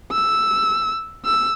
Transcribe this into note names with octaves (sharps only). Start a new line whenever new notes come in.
E6
E6